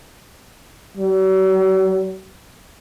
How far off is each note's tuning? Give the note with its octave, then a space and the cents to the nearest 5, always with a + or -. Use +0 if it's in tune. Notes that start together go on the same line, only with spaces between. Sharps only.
F#3 +45